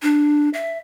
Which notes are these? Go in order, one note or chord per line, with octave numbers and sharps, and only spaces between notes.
D4
E5